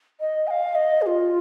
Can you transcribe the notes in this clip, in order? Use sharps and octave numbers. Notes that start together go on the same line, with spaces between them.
D#5
G#5
F5
D#5
G#4
F4